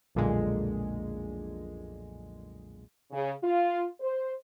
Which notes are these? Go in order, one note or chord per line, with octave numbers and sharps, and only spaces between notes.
B1 F2 A#2 D3 G#3
C#3
F4
C5